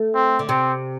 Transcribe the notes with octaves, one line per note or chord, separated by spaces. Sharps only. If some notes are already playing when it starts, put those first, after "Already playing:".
Already playing: A3
C4
D3
C3 C4